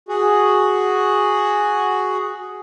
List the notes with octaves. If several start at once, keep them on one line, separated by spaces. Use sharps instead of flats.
F#4 G#4